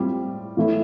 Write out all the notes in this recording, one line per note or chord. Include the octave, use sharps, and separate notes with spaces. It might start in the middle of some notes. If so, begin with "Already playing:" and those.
Already playing: A2 G3 C4 F4
A2 E3 A3 E4